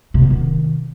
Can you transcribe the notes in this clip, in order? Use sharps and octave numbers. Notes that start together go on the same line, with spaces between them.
C3
B3
D#3